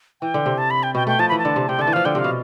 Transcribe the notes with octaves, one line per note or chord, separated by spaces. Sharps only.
E3 G5
D3
C3
A5
B5
G5
B2 G5
A3 G5
F3 A5
E3 B5
A5
D3
C3
C3 G5
D3 A5
E3
F3 F5
D3 G5
C3 F5
B2